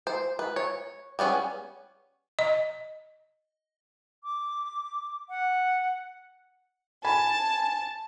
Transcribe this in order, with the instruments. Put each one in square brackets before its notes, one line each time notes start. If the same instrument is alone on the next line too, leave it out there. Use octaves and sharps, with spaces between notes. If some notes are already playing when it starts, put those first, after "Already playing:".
[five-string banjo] C5
B4
C#5
G3 B3 C#4 G#4
[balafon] D#5
[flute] D6
F#5
[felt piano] G#5 B5 [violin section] A5